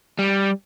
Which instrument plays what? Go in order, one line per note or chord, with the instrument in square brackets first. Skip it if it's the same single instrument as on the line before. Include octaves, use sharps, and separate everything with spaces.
[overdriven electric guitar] G3